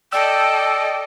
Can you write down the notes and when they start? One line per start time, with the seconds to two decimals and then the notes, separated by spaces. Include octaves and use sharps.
0.12 A4 D5 D#5 G5 E6